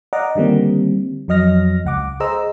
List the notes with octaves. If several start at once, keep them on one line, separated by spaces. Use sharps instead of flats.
D5 D#5 F5 F#5 A#5 D6
D3 D#3 G3 A#3 C4
F2 F#3 D#5 F6 A#6
C#2 F#5 D6
G#4 C5 D#5 A#5 E6